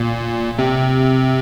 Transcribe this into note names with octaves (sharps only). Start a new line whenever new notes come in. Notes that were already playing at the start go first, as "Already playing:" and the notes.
Already playing: A#2
C3